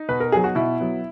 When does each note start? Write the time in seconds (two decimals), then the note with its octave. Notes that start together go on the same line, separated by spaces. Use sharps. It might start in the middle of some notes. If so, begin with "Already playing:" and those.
Already playing: D#4
0.08 B2 B4
0.20 A#4
0.32 F#3 B3 G#4
0.44 F#4
0.55 B2 E4
0.80 F#3 B3